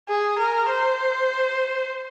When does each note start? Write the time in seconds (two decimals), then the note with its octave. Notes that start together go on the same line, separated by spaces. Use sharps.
0.09 G#4
0.39 A#4
0.70 C5